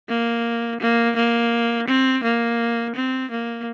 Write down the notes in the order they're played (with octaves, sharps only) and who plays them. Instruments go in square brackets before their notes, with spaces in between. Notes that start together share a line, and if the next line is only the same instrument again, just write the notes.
[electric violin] A#3
A#3
A#3
C4
A#3
C4
A#3